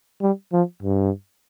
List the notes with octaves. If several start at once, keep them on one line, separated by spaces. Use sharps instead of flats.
G3
F3
G2